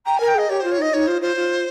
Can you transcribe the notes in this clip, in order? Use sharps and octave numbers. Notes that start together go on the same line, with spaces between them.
G5 A#5
A#4 G#5
G5
G#4 D#5
G4 C#5
F4 C5
C#5
D#4 D#5
D#4 C#5
F4 C5
F4 C5
F4